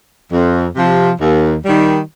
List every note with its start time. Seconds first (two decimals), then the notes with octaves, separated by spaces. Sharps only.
0.32 F2
0.76 C3 F3
1.21 D#2
1.65 D#3 G3